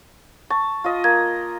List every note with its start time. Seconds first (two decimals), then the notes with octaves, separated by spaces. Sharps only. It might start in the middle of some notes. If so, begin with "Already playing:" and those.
0.50 A5 C#6
0.84 F4 D#5
1.04 A#3 G#6